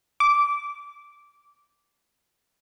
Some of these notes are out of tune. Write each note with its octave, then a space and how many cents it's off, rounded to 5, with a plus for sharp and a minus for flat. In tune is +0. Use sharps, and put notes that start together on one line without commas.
D6 -20